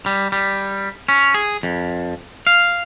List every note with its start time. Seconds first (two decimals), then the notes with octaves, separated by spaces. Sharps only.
0.06 G3
0.32 G3
1.09 C#4
1.34 G#4
1.63 F2
2.47 F5